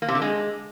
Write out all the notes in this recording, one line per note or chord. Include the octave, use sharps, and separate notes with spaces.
A#3
C3
D3
G#3